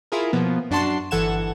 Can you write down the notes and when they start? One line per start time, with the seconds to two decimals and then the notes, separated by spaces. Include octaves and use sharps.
0.12 E4 F4 G#4 A#4
0.33 B2 F3 A#3 B3
0.71 F#2 D4 F#4 A5 C6 C7
1.11 G1 E3 A4 F#5 G#6 E7